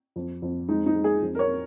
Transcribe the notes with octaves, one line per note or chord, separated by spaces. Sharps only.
F2
F2
G#3 D#4
D#4
G#3
G#4
F2
A#4
C#5